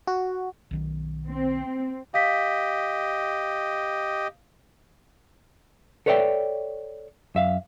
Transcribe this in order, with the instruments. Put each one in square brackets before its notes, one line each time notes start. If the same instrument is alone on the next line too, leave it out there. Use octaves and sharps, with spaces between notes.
[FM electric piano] F#4
[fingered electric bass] B1 D#3 B3
[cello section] C4
[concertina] G4 D#5 [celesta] F5 B6
[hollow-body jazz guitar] A4 B4 C#5 D5 E5 G5
F#2 E5 F5